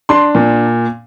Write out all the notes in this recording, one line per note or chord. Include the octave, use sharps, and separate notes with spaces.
D4 C6
A#2